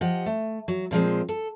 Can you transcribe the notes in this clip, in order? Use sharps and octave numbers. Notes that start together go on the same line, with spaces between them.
F3 G4 D#5 F#5
A3
F#3
A#2 F3 G#3 C4
A4